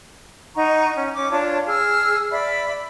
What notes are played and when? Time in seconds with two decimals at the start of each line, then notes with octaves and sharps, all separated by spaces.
0.56 D#4 F#5 A#5 C#6
0.96 C#4
1.15 C#4 D6
1.30 D4 F4 C#5 A5
1.67 G#4 E6 F6
2.31 D5 E5 B5